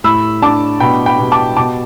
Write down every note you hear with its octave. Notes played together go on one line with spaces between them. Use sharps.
A2 B5 E6
D4 A5 D6
B2 G5 B5
G5 B5
B2
A5 D6
B2 A5 D6